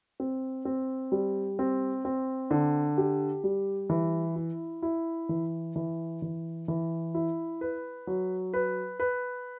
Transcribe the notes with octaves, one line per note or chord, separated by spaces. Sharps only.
C4
C4
G3
C4
C4
D3
G4
G3
E3
E4
E4
E3
E3
E3
E3
E4
B4
F#3
B4
B4